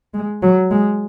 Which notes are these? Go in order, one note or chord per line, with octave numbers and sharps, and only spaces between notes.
G#3
F#3
G#3